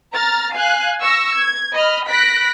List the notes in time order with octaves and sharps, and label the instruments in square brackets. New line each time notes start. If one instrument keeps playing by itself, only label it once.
[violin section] A#5 F6 A6
F5 G#5 F#6
C#6 E6 A#6
G#6
D#5 B5 F6
B5 F#6 A#6 B6 D7